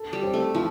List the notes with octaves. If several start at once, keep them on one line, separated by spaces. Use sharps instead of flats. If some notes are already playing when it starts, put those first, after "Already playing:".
Already playing: A4
G3
C4
A3
F3 E4